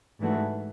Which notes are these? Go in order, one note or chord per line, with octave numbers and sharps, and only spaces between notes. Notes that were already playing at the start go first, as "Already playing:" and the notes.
G#2 E3 A3 D4 F#4